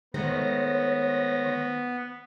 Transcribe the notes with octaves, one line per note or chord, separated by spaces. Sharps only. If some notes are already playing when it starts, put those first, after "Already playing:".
D#3 G#3 A3 B3 C5 C#5 A#6